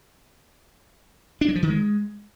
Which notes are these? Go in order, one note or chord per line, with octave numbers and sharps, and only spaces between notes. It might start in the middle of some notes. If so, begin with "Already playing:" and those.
D4
F#3
F3
D#3
G#3